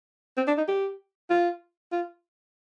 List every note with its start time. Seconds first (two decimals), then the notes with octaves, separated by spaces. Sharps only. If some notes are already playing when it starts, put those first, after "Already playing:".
0.37 C4
0.48 D4
0.58 D#4
0.68 G4
1.30 F4
1.92 F4